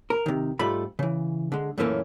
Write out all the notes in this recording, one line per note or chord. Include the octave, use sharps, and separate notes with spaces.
A#4
C3 D#3
G#2 G3 A3 F4 B5
C#3 E3
D3 G#3
F#2 A#2 E3 A3 A#3 C#4